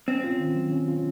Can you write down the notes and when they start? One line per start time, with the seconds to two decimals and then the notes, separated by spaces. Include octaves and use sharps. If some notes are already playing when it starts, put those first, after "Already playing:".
0.08 C4 C#4
0.24 F4
0.40 D#3
0.56 F#3
0.72 C#4
0.88 F4